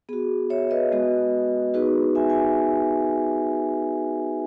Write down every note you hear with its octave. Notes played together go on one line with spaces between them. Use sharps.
B3 F#4 G#4
C#5 E5
B4 D#5
G#3 B3 F#4
B3 D#4 F#4 G#4 B4
E5 G#5
E5 G#5